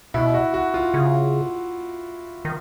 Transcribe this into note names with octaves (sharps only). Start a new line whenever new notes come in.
B2 E4
F#4
F#4
F4
C#3
D#3